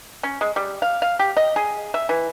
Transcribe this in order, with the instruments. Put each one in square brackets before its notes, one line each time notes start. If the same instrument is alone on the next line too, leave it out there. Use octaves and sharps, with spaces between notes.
[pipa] C#4
G#3
G3
F5
F5
G4
D#5
G#4
E5
E3